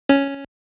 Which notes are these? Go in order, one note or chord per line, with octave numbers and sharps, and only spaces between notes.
C#4